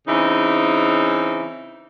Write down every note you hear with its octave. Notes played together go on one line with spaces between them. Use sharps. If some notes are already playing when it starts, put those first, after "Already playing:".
C#3 E3 C4 D#4